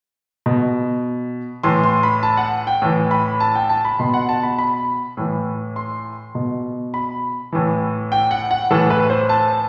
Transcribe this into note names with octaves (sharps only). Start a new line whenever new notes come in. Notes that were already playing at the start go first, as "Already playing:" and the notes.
B2
A2 E3 C6
C6
B5
A5
F#5
G5
A2 E3
B5
A5
G5
A5
B5
B2 C6
F#5
A5
B5
B5
A2 E3
C6
B2
B5
A2 E3
G5
F#5
F#5
A2 E3 A4
B4
C5
A5